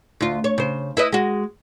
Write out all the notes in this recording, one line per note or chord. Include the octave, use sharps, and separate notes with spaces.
D2 F4
C#5
C#3 C5
E4 B4 D#5
G#3 F#4